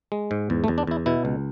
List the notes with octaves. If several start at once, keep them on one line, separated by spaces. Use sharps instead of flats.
G#3
G#2
E2
A3
E2
D4
E2 E4
B2 E4
C#2